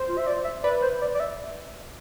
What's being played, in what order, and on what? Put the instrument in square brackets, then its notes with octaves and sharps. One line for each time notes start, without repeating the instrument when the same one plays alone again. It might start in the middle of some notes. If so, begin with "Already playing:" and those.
Already playing: [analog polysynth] C5
[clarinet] F4
E5
D5
E5
[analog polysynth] B4 [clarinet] D5
[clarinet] C5
D5
D5
E5